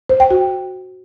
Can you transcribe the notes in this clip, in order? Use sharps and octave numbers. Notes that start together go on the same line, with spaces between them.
C5
G5
F#4